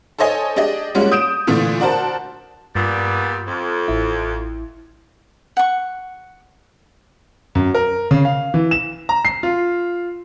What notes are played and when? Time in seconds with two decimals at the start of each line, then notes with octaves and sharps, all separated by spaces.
0.19 A4 C5 C#5 D#5 G#5
0.56 D4 G4 G#4 D#5
0.95 G3 G#3 A#3 C#4 F4 F#4
1.12 D#6 G6 D7 E7
1.47 A#2 D3 E3 A3
1.80 D4 F#4 A#4 C5 A5
2.75 G2 A#2 G3 B3
3.47 F2
3.88 A1 E4
5.57 F#5 C#6
7.55 F#2
7.75 A#4
8.11 C#3
8.25 F5
8.54 E3
8.71 E7
9.09 A#5
9.25 C7
9.43 F4